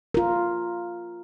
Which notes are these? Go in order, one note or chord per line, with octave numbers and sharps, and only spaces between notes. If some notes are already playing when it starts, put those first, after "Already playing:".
F4 A#4